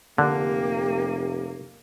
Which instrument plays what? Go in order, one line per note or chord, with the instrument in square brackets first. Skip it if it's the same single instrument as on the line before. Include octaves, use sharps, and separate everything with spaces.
[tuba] F1 [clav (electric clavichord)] D3 [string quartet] A#3 [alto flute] G4